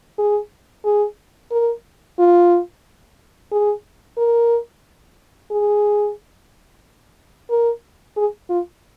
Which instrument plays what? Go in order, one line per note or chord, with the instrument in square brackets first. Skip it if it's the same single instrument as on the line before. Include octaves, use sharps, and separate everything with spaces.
[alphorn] G#4
G#4
A#4
F4
G#4
A#4
G#4
A#4
G#4
F4